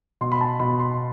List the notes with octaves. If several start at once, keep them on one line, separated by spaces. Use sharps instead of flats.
B2 C6
B5
A5
B2 B5
C6